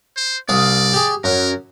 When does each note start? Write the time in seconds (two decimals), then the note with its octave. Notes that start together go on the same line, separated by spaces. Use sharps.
0.17 C5
0.49 C2 D5 F5 D#6
0.93 G4 G#4
1.24 F#2 A#4